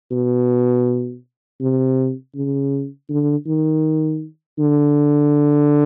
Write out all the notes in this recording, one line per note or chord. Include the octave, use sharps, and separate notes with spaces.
B2
C3
C#3
D3
D#3
D3